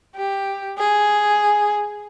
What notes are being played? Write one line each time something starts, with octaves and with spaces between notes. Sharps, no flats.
G4
G#4